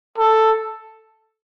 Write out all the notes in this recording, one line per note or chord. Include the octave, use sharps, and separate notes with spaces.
A4